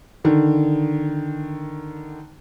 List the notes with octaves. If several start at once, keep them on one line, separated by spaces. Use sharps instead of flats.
D3 D#3